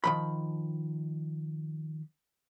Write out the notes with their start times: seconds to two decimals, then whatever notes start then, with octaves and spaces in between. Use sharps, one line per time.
0.04 D#3 F3 B5